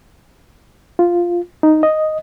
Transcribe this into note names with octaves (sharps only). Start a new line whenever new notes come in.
F4
D#4
D#5